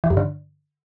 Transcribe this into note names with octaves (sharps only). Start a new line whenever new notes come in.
E3
G2
D3